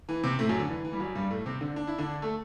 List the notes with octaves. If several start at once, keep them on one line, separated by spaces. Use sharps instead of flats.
E3
C3 C4
A2 A3
F#2 F#3
D3
E3
E3
G3
F#2 F#3
G2 G3
A2 A3
C3 C4
D3 D4
D4
E4
D3 D4
A3 A4